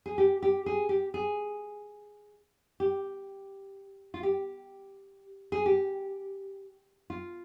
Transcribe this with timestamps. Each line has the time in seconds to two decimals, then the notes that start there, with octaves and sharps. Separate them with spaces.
0.06 G#4
0.18 G4
0.42 G4
0.66 G#4
0.89 G4
1.14 G#4
2.80 G4
4.14 F4
4.23 G4
5.52 G#4
5.66 G4
7.10 F4